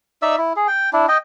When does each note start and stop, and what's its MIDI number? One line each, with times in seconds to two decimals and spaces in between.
0.22 0.36 63
0.22 0.36 74
0.22 0.36 76
0.22 0.36 88
0.38 0.53 64
0.56 0.67 68
0.68 0.90 79
0.93 1.06 62
0.93 1.06 64
1.08 1.18 75
1.08 1.18 79